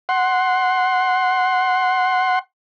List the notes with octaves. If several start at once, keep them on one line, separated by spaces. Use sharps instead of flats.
F#5 C6